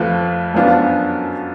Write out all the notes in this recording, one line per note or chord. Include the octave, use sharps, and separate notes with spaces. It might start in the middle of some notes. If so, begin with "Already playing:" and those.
Already playing: F2 F3 A3 F4 B4
F#2 F3 B3 D4 F4